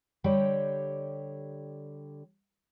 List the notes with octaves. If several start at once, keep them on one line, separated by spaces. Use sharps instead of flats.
D3 G3 G4 C#5 G5